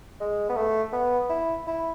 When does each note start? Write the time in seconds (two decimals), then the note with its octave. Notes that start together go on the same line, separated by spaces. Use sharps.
0.20 G#3
0.50 B3
0.57 A3
0.93 B3
1.30 E4
1.67 E4